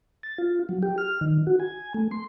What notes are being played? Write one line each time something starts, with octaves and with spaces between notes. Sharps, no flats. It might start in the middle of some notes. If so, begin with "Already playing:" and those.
A6
F4
F#3
G4
F6
D#3
F#4
G#5
A3
C6